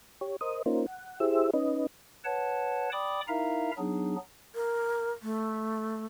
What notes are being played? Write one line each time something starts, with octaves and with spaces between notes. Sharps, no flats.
G4 C#5
A#4 C5 D#5 D#6
A#3 C#4 D#4 F4 A#4 C5
F#5
E4 G4 G#4 C5 E5 E6
C#4 D#4 B4 D#5
B4 C#5 F#5 A5
D5 G5 B5 D6 D#6
D#4 E4 A#4 E5 F5 A#5
F#3 B3 D4 D#4 G#4
A#4
A3